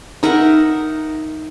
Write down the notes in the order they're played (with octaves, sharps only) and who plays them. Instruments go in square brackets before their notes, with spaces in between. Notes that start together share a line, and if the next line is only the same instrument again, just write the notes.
[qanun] D#4 A#4 E5 F#5